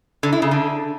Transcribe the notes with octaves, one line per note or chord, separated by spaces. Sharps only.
D3
E4
C#3
D3